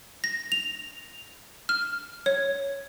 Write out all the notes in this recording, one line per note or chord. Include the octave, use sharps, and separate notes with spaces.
A#6
F7
F6
C#5